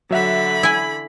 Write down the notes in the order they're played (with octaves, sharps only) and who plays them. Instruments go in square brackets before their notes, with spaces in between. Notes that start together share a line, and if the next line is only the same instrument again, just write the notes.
[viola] D3 B5 [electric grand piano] F#3 E5 F#5
[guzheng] E4 G#5